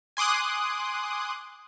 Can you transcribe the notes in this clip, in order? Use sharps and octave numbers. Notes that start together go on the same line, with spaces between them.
G#5 C6 D6 D#6 F#6